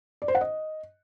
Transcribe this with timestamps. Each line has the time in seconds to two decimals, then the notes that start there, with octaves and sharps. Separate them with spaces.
0.22 D5
0.28 C5
0.35 F#5
0.41 D#5